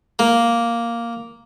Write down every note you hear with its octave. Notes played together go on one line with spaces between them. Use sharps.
A#3